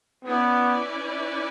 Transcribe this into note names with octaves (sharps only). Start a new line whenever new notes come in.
B3 C#4 E4 B4 D5